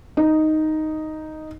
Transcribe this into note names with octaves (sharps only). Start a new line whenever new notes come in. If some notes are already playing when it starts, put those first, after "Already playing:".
D#4